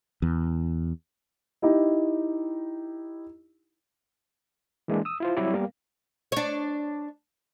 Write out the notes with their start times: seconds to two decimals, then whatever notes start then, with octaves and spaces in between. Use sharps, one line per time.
0.22 E2
1.62 D#4 E4 G4 D#5
4.88 E3 G#3 A#3 D4
5.05 D#6 E6
5.20 E4 F4 C5
5.37 F#3 G3 C4 E4 C#5 D5
5.54 G3 A#3 B3 A#4 F5
6.32 D4 C#5